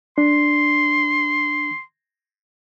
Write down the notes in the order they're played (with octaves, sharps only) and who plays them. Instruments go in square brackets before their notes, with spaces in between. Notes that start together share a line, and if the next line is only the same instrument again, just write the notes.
[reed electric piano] D4 [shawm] C6